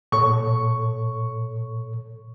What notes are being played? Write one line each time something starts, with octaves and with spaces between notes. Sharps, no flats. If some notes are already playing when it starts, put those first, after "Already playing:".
A#2 A4 C#5 C#6